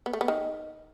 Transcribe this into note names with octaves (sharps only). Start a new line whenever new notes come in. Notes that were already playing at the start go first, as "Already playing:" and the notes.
B3
A3
B3
D#3